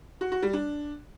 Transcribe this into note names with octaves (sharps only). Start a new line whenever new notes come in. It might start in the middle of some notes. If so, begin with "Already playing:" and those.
F#4
F#4
G3
D4